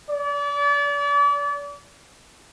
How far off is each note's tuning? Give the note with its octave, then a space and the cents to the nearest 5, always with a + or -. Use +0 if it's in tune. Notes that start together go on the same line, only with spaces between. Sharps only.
D5 -35